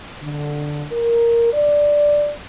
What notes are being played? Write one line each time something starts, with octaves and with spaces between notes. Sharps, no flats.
D3
A#4
D5